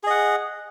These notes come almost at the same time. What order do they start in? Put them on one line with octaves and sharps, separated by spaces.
G#4 D#5 F#5